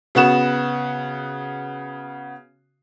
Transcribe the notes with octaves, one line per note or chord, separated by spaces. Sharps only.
C#3 B3 F#4 E7